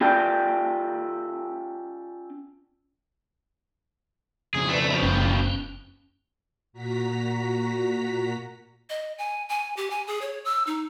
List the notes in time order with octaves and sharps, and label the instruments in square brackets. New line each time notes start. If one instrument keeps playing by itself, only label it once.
[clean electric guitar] C#4 F4 G4 A4 D5 G5
[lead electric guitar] F2 C#3 [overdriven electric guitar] G#4
[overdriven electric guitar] A3 [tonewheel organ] B4 D5 A#5
[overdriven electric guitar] B2 F3
[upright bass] F#1 [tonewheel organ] F#2 C#4 G5
[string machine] A#2 F#4 A#5 B6
[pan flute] D#5
G#5
G#5
G4
G#5
G#4
C#5
E6
D#4